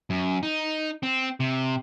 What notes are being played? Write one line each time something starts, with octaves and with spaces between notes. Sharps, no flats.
F#2
D#4
C4
C3